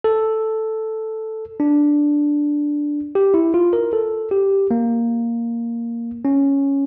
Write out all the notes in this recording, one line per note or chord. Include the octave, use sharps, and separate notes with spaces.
A4
D4
G4
E4
F4
A#4
A4
G4
A#3
C#4